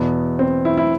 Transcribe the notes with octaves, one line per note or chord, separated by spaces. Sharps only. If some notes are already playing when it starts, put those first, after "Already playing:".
Already playing: E2 B2 B3
C4
E4
E4